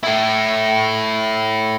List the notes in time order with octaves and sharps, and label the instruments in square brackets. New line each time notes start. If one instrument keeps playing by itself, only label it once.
[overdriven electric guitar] A3 E4